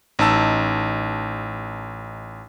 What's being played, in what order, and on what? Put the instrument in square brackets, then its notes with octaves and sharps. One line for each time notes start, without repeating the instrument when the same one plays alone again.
[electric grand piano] A1 D#4 A5 E6